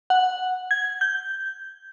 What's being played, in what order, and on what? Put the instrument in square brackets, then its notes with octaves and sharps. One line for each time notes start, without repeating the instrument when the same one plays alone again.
[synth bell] F#5
G#6
G6